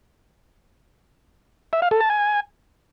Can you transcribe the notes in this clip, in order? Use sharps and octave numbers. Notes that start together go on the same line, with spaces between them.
E5
F5
A4
A5
G#5